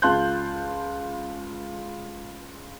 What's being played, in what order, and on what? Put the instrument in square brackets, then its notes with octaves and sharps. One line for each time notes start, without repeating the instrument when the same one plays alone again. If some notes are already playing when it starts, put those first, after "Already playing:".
[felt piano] C#2 F4 A5 C6 F#6 G6